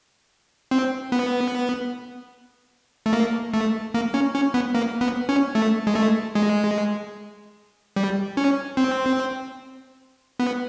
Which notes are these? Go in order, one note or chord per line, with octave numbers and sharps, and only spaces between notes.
C4
B3
A3
A#3
A3
A#3
C#4
C#4
B3
A#3
B3
C#4
A3
G#3
A3
G#3
G3
C#4
C4
B3